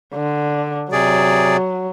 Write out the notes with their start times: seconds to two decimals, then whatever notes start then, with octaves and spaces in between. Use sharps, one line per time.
0.14 D3
0.92 C3 F#3 G#4 D5